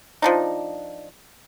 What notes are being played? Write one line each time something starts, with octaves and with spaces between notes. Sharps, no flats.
F3 D4 D#4